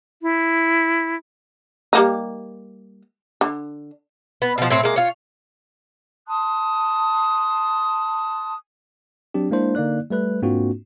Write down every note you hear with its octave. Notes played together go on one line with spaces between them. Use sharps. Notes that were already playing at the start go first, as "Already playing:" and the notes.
E4
G3 A#3 D#4
D3
B3
B2 F3
A2 C4 C#5
G#3 A#3
F4 C#5
A5 C6 D#6 F#6
F#3 C4 D4 G4
G#3 A#3 D4 E4 C5
D3 A#3 D#4 D5 F#6
G3 A3 B4 F#6
G#2 A#3 C4 D4 F4 F#4